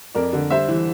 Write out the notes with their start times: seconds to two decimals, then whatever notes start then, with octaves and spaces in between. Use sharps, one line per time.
0.15 F2 A#4 D5
0.33 D3
0.50 G3 C5 E5
0.68 E3